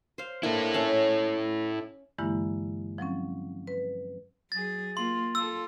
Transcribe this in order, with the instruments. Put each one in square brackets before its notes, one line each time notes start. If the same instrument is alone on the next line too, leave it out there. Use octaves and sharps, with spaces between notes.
[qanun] C5 F5
[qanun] A#3 D4 A5 [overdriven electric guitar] E4 A4
[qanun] C#4 E5 A5
[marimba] G2 D3 E3 G#3 A#3 E4
F3 F#3 C4 C#4
B4
[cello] F#3 G#4 [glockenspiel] A6
[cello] A#3 F4 [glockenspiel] C6
[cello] F4 A4 [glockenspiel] E6